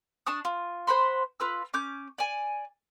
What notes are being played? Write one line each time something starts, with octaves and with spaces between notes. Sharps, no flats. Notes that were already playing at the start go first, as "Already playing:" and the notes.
D4 A5 C#6 D#6
F4
C5 F#5 B5 C6
F4 B4 E6
C#4 D6 G6
D5 G#5